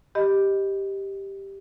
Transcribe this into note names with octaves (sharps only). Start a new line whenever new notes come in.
G4 D#5 B5